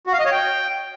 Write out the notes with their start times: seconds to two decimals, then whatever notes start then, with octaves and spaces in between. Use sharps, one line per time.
0.07 F#4
0.13 F5
0.19 D#5
0.25 C#5
0.32 G5